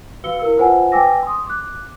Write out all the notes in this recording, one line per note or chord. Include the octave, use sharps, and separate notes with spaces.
F#4 B4 F5 E6 C#7 G7
E4 A#4 E6
F4 B4 C5 F#5 G#5 A5
B4 G5 G#5 D6 E6 A#6
C6 D#6
D6 F#6